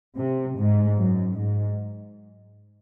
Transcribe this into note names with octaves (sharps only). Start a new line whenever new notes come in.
C3
G#2
F#2
G#2